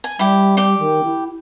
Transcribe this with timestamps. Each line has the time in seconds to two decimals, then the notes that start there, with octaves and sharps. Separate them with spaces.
0.04 G#5
0.19 G3 E4 G4
0.57 G4 G5
0.79 D#3
1.04 E4